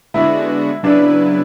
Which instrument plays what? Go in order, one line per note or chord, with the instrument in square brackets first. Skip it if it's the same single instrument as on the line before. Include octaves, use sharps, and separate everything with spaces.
[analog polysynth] D3 G#3 B3 D4 F#4 [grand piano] E4
[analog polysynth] C#3 F#3 B3 E4 B4 [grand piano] D4